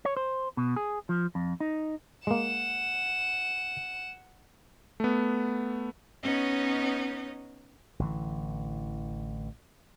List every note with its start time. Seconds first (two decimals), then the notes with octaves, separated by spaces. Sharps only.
0.05 C#5
0.17 C5
0.57 B2
0.76 G#4
1.09 F3
1.35 F2
1.60 D#4
2.27 G#3 A#3 F#5 E7
5.00 A3 B3
6.22 B3 C#4 D#4 C#5 D#5
7.99 A1 D3 E3